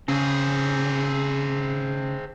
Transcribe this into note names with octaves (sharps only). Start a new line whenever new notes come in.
C#3 C4 G#4